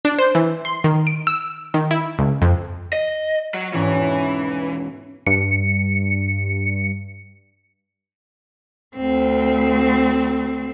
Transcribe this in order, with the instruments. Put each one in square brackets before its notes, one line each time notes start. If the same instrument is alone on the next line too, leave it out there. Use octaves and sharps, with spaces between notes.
[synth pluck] D4
C5
E3
C6
D#3
D7
E6
D#3
E4
C#2
F2
[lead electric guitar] D#5
F#3
[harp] E1 G#2 C#4 [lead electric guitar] E3
[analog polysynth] G2 C#7
[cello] D2 C4